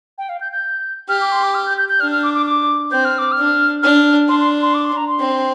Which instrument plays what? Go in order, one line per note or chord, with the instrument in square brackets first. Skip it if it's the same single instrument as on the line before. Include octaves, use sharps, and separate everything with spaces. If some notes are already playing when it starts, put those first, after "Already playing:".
[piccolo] G5
F5
G6
G6
[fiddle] G4 [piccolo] F6
[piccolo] D6
C6
D6
F6
G6
G6
G6
[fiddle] D4 [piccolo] F6
[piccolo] F6
D6
D6
D6
[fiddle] C4 [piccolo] G6
[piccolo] F6
D6
F6
[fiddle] D4
[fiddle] D4 [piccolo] F6
[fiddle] D4 [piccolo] C6
[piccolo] C6
C6
D6
C6
A#5
C6
[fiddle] C4